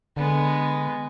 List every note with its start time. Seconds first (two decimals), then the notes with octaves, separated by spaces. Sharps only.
0.17 D3 G#3 B3